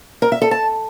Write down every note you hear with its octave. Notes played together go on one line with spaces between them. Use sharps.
A#4
E5
A4
A5